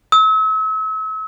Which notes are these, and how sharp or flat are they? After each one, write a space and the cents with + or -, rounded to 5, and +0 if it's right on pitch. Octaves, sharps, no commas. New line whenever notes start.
E6 -40